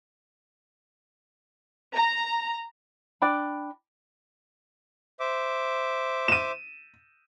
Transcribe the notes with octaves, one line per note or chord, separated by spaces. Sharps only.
A#5
D4 D5 G5 B5
C5 E5 D6
D#7 E7